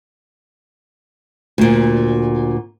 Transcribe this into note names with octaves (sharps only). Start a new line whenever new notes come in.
D2 A#2